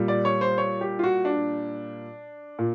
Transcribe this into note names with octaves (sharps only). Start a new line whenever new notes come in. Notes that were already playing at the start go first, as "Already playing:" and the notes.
Already playing: A#2 G3
D5
C#5
C5
C#5
G4
F4
F#4
D4
A#2